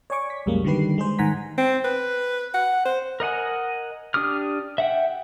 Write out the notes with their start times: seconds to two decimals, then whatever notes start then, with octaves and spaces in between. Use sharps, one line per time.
0.10 C#5 D5 G#5 C#6 D6
0.30 B6
0.46 C2 F#2 G3 G#3 A#3
0.64 D3 D#3 G3 G4 B4 C7
0.98 G#3 G#4 C5
1.19 G#2 D#3 F#5 G#5 A#5 B6
1.58 C4
1.84 B4
2.54 F#5
2.85 C5
3.20 A#4 D#5 F#5 G#5
4.14 D4 G4 D#6 F6
4.78 E5 F#5 G5